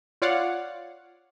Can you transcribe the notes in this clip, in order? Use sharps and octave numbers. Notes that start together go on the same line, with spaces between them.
F4 C#5 D5 F5 F#5